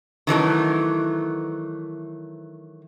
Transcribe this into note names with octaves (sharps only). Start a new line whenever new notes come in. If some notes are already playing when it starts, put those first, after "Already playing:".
D#3 E3 F#3 A3